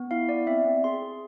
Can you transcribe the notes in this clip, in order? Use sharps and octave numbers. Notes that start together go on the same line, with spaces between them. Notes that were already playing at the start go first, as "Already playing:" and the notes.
Already playing: B3
E4 F5
B3 D5
C4 E5
C4
G#4 C6
G#4